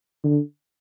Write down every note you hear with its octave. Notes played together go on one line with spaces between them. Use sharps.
D3